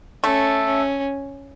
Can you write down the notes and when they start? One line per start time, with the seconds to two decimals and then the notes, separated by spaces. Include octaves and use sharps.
0.24 A3 C#4
0.65 C#4